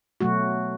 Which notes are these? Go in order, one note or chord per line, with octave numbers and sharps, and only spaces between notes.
B2 F#3 A3 F#4